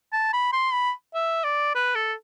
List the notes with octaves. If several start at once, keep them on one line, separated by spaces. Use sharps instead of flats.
A5
B5
C6
B5
E5
D5
B4
A4